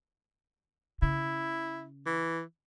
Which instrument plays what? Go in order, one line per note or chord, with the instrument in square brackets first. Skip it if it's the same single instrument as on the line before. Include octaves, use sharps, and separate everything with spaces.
[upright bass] C#3 [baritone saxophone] E4
[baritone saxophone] E3